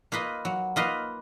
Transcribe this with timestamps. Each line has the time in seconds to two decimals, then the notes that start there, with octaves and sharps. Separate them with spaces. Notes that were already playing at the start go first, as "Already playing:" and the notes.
0.12 A#3 F4 B4 D#5
0.45 F#3
0.76 A#3 F4 B4 D#5